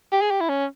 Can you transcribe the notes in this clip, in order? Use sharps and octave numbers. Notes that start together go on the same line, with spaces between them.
G4
G#4
G4
E4
C#4